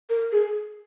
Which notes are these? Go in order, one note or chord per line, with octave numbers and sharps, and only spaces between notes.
A#4
G#4